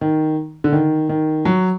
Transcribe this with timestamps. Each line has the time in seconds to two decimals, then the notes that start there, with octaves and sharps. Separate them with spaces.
0.01 D#3
0.64 D3
0.72 D#3
1.09 D#3
1.45 F#3